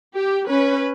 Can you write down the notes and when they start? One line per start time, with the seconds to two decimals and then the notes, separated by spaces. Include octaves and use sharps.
0.15 G4
0.48 C#4 B4